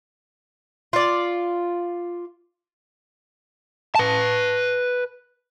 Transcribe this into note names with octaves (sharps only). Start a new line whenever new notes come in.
F4 D5
B4 A5